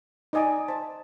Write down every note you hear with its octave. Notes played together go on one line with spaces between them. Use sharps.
D#4 D5 D#5 G#5 D6
C5 A5